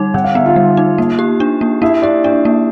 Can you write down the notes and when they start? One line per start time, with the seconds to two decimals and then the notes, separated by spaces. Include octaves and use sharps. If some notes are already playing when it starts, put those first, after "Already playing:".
Already playing: D3 G3 D#4
0.14 D3 F#5
0.24 F5
0.35 B3 E5
0.46 F4 F5
0.56 G3
0.77 D#4
0.98 A#3
1.19 G4
1.40 D4
1.61 A#3
1.81 A#3 E4 E5
2.02 G4 D5
2.24 D4 D5
2.45 A#3